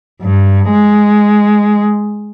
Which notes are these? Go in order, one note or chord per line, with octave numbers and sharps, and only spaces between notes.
G2
G#3